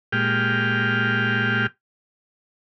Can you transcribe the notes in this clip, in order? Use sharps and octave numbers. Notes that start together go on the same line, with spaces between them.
A#2 G#3 G4 G5 F6